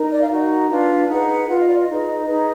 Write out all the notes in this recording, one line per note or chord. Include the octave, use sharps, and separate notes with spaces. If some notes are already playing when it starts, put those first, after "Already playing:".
Already playing: D#4 A#4
D5
F5
D#4 F#4 A#4
D4 F4 B4 F5
D#4 G#4 B4 F#5
F4 B4 F#5
D#5
D5
D#5
D#4 G#4 B4
D#4 G#4 B4